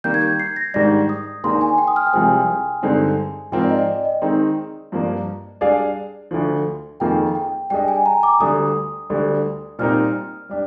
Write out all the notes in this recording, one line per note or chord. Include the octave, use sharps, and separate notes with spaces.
D#3 G3 A#3 G6
G#6
G6
C7
A#6
G#2 D#3 G3 D4 A#6
D#6
D#2 D#3 A#3 D4 G#4 C6
G#5
G5
D#6
F6
G5
C2 C3 F3 G#3 C4 G#5
G2 D3 G#3 C4 D#4
G#2 F3 C4 F4 A#4 G5
D5
D#5
D5
D#5
D#3 G#3 C4 D#4
G2 F3 A#3 D4
G3 D4 G#4 D5 F5
D2 D3 F3
F2 D#3 A#3 F4 G#4 G5
G5
G3 D4 G#4 D#5 G5
G#5
A#5
D6
D2 D3 G3 D#6
D2 D3 G3 D4
A#2 G3 C4 D#4 A#4 F6
G3 D4 G4